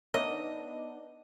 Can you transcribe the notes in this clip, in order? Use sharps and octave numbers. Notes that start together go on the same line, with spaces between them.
B3 D4 D#4 A#4 C#5 D#5 E5